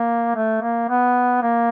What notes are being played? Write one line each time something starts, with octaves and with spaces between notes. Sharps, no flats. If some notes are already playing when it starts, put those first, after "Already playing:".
Already playing: A#3
A3
A#3
B3
A#3